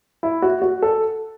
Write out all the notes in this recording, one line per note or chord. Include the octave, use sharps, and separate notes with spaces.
E4
F#4
F#4
A4